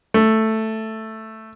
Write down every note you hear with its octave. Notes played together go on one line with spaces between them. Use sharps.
A3